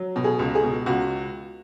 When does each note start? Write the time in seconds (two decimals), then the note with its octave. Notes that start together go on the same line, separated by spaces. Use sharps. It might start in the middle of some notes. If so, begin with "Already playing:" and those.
Already playing: F#3
0.16 B2
0.24 G#4
0.39 C#2
0.55 G#4
0.63 B2
0.86 C#2 F#4